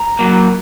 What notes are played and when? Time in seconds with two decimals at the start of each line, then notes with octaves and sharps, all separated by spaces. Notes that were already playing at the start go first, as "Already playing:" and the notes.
Already playing: A#5
0.19 F#3 A#3